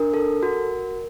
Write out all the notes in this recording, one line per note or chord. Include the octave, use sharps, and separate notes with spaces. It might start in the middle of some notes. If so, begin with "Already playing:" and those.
Already playing: D4 A#4
A4
F#4